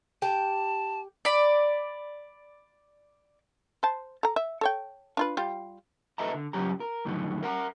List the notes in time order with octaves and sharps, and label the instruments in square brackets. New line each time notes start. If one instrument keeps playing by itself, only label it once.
[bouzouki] G4 G5 [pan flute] A5
[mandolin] D5 B5
[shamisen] C5 A5
A4 A#5
E5
A4 C#5 G5
D4 F4 B4
G3 F4 G4
[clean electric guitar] A4 B4 D#5 E5 A5 A#5
D3
C#2 G2 F#3 C#4 G4 A#5
A#4
F2 A2 D3 D#3 F#3
A#4 F#5 A#5